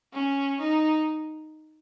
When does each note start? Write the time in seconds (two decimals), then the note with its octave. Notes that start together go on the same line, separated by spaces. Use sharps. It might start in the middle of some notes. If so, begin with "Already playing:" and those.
0.13 C#4
0.60 D#4